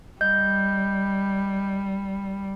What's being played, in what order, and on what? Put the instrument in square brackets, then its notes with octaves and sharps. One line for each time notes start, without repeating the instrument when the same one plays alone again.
[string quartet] G3 [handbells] D#5 G6